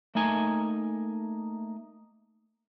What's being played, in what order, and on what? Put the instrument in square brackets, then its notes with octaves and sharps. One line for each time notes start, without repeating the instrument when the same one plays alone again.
[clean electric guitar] A3 A#3 D#4 G#5